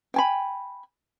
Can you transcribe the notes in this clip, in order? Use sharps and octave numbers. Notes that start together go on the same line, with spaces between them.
G5 G#5 B5